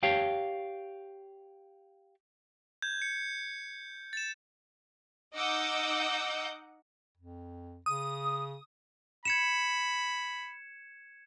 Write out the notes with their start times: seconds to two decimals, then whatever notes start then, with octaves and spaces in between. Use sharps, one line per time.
0.03 G4 C#5 F5 G5 A5
2.82 G6 G#6
3.02 C#7
4.13 A6 E7
5.33 D#4 D#5 F#5 D6 E6 G6
7.17 F2
7.86 C#3 D#6
9.25 B5 G#6 C#7 E7